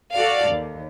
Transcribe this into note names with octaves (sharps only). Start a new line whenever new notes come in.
F#4 A4 D5 F5
D#2